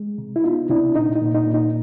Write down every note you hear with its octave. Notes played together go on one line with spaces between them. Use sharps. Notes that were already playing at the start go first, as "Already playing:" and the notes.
Already playing: G#3
C3
E4
B3 D#4 F4
C3 D4 E4
A#2 D#4
D#4
A#2
D#4
A#2
D#4